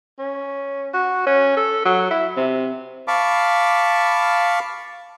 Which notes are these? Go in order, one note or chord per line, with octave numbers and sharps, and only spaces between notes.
C#4
F#4
C#4
A4
F#3
E4
C3
F5 A5 B5 C#6 D6